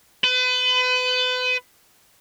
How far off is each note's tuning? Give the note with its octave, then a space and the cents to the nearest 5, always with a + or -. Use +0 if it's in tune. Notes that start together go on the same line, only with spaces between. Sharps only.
B4 +35